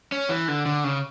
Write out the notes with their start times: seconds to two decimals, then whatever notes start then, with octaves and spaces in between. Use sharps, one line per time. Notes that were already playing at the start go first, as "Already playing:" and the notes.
0.12 C#4
0.29 E3
0.48 D3
0.66 D3
0.84 C#3